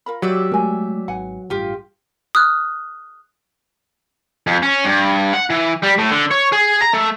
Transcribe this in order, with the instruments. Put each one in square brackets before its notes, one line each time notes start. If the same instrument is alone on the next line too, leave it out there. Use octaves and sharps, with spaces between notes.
[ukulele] F4 A#4 B5
[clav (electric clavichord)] F#3 [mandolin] G4 D5 E5
[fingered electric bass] G#3 A3 [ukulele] A#4 G#5
[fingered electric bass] G#1 [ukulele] B4 F#5 G#5
[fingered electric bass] A1 G2 [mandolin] F4 G4 [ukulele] G5
[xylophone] D#6 F6 F#6
[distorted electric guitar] F2
C#4
G2
F#5
E3
G3
A2
D3
C#5
G#4
A#5
A3